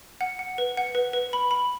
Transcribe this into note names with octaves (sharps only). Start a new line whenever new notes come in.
F#5
F#5
B4
F#5
B4
B4
B5
B5